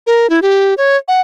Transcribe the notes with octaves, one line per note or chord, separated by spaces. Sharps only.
A#4
E4
G4
C#5
F#5